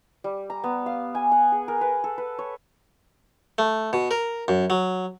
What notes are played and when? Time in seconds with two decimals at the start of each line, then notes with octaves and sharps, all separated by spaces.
0.24 G3
0.50 A#5
0.64 B3
0.86 F5
1.15 G#5
1.32 F#5
1.52 G#4
1.68 A#4
1.81 B4
2.04 A4
2.18 B4
2.39 C#5
3.58 A3
3.93 B2
4.11 A#4
4.48 F#2
4.70 F#3